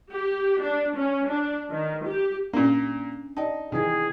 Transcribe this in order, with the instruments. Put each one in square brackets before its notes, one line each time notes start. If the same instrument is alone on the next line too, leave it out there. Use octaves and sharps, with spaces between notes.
[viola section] G4
D4
C#4
D4
D#3
G4
[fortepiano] A#2 A#3 [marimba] C#4 [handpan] D4
[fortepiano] D#4 [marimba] D5 G5 A5
[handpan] C3 E3 [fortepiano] D#3 [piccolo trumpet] G#4